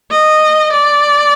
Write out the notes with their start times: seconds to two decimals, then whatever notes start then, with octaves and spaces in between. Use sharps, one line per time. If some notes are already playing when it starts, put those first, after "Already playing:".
0.11 D#5
0.72 D5